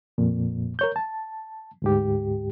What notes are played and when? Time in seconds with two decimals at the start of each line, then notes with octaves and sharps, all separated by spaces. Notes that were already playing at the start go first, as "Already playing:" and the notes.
0.18 F2 A#2
0.79 A#4 C#5 G6
0.96 A5
1.82 D2 G#2 G4